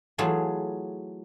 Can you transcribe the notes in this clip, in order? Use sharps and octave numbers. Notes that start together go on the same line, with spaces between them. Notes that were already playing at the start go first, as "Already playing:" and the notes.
E3 F#3 A3 F4 G#4